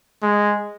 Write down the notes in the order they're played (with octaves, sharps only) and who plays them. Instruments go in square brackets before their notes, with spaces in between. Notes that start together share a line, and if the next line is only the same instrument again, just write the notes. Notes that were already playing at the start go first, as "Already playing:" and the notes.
[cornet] G#3